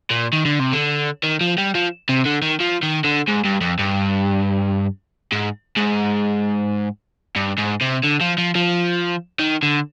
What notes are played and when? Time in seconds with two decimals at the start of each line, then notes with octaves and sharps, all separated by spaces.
0.11 A#2
0.33 D#3
0.45 D3
0.59 C3
0.73 D3
1.23 D#3
1.41 F3
1.58 G3
1.75 F3
2.09 C3
2.25 D3
2.42 D#3
2.60 F3
2.83 D#3
3.04 D3
3.28 G#2
3.45 G2
3.61 F2
3.79 G2
5.32 G#2
5.77 G#2
7.36 G2
7.58 G#2
7.82 C3
8.04 D3
8.21 F3
8.38 F3
8.55 F3
9.39 D#3
9.63 D3